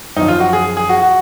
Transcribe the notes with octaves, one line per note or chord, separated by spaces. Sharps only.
F#2 F3 D#4
F4
F#4
G#4
G#4
F#4
F#4